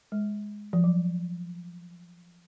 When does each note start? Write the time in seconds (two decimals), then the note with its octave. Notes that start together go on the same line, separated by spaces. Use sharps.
0.12 G#3
0.73 F3
0.84 F#3